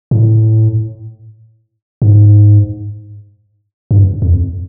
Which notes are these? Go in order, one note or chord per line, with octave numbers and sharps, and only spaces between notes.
A2
G#2
G2
F2